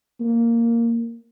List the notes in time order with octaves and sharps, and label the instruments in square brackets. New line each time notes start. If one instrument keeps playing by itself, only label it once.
[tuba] A#3